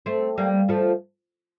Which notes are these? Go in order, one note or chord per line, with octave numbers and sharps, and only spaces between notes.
A3 C4
G3 A#3
F3 A3